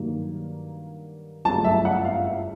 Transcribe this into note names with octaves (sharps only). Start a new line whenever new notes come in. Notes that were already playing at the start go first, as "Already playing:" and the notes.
Already playing: G2 D#3 F#3 A#3
G1 F#2 C#3 F#3 A3 A5
E5
F#5
F5
E5